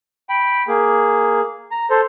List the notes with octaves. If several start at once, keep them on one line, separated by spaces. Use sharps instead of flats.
G5 B5
A#3 G#4
A#5
A4 C5